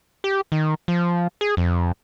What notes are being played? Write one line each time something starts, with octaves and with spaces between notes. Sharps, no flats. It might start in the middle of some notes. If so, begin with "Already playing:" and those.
G4
D#3
F3
G#4
F2